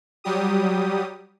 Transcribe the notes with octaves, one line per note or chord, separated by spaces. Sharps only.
F#3 G3 G4 D#6